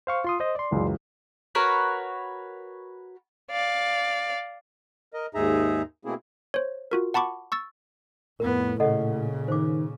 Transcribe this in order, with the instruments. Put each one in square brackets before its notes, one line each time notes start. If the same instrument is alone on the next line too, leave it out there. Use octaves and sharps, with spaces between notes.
[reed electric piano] C5 F5 C#6
F4 C6 D#6
C5 D#5
D5 C6
[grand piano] C#2 F#2 E3
[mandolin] F#4 A#4 B4 C#5
[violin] D5 F5
[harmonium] A#4 D#5
D#2 G#2 D#4 G#4 E5 A#5
B2 A3 A#3 C4 E4 G#4
[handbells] C5 C#5
F4 F#4 A#4
F#5 A5 B5 C#6 D6
C#6 E6 A6
[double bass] F2 B3 [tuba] A2 [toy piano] A#4
[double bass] A#2 C#3 [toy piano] A4 D#5 F#5
[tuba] D#3 [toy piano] C5 D6